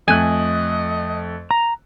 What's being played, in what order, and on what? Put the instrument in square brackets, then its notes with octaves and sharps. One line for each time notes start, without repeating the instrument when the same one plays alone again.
[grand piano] F2 A3 F#6 [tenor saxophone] D#5 [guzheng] G#5
[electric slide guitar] A#5